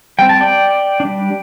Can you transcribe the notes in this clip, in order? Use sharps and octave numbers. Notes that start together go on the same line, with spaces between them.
G3 C4 G5
A5
D5 G5
G3 D4